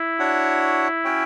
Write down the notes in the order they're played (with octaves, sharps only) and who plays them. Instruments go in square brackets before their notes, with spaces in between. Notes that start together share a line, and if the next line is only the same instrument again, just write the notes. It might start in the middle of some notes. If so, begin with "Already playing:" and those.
Already playing: [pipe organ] E4
[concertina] D4 F#4 C#5 F#5
C#4 F#4 C#5 G5